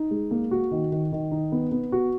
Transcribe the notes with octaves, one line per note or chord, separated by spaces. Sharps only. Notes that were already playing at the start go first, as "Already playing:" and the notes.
Already playing: D#4
G#3
A#3
F#4
D#3
D#3
D#3
D#4
B3
B3
F#4